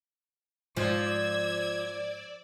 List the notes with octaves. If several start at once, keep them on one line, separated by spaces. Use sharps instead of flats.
G#2 F3 D5 E6 G#6